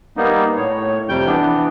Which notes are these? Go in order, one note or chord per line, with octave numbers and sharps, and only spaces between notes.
G3 A#3 B3 D#4
A2 C#5
F2 C3 G3 G5 G6
E3 B3 D4